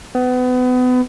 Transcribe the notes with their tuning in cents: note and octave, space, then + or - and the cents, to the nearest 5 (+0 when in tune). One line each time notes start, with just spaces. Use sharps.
B3 +30